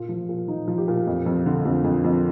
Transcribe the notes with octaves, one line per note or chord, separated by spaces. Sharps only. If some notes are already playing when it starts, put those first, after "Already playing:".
Already playing: A#2 F4
F3
A#2
F3 D#4
F3
G4
A#2
F2
F2
D3
F2
F2
F2